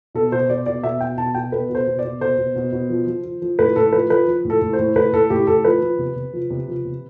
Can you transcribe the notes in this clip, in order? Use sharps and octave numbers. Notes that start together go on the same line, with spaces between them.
B2 A4
B2 C5
B2 D5
B2 D5
B2 E5
B2 G5
B2 A5
B2 G5
B2 B4
B2
C5
B2
D5
B2
B2 C5
B2
B2
B2
F3
F3
F3
F3
A2 B4
A2 A4
F3 B4
F3 B4
F3
A2
A4
A2
C5
A2
A2 B4
A2 A4
A2 G4
A2 A4
F3 B4
F3
C3
C3
F3
C3
F3
C3